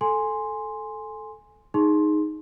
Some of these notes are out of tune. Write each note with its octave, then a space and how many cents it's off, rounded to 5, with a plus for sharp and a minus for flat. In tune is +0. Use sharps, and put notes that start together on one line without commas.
A4 -10 G#5 +0 C6 +0
D#4 +0 G#4 +0 C6 +10